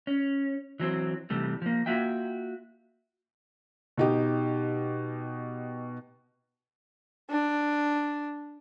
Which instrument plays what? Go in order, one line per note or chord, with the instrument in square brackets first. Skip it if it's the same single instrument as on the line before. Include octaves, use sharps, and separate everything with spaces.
[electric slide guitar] C#4
E3 F#3 C4
C3 E3 G3 A3
F3 A#3
A#3 F4 F#4 E5 G5
[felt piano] B2 D#4 G4
[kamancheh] D4